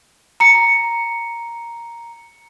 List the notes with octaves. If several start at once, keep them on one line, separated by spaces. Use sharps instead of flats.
A#5 C#7